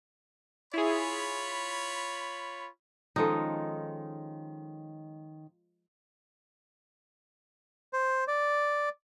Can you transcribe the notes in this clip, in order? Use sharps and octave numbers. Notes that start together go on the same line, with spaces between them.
E4 F4 G#4 C#5 B5
D#3 F3 G#3 C#4 D#4 A4
C5
D5